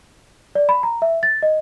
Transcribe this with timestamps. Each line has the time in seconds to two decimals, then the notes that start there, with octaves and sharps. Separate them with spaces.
0.55 D5
0.69 B5
0.83 A#5
1.02 E5
1.23 A6
1.43 D#5